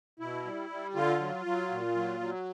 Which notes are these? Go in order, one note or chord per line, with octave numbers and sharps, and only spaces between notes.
B2 E4
G3
G3
D3 F4
F#3
F#3
A#2
F#3
F#3